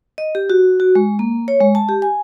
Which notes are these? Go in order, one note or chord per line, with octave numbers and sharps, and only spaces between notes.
D#5
G4
F#4
F#4
G#3
A#3
C#5
G#3
A5
G4
G#5